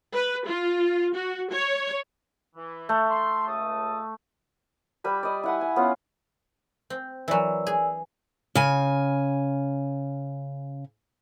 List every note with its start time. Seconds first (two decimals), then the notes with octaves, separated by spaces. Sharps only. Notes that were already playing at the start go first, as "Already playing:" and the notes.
0.14 B4
0.47 F4
1.16 F#4
1.51 C#5
2.55 E3
2.89 A3
3.10 C6
3.47 C#2 A5 D#6
5.04 G3 B4 B5
5.23 D5 D#5
5.43 E4 F#5 G#5
5.61 G#5
5.76 B3 C#4 F4
6.90 C4
7.28 E3 F#3 A#4 D5 E6
7.67 G#4
8.55 C#3 G#5